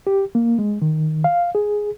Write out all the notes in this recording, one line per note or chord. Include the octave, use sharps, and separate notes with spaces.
G4
A#3
G#3
D#3
F5
G#4